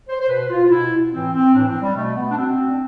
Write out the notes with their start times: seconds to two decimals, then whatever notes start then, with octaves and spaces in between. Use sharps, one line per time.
0.09 C5
0.21 C5
0.29 B2 B4
0.50 F4
0.66 F4
0.71 B2 E4
1.12 A2 E3 C4
1.34 C4
1.54 A2 E3 D4
1.68 C4
1.82 G3
1.96 B2 A3
2.16 B3
2.31 D4
2.37 B2 C4
2.68 D4